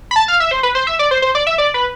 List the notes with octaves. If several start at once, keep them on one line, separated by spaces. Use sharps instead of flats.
B5
A5
F5
E5
C5
B4
C5
E5
D5
C5
C5
D5
E5
D5
B4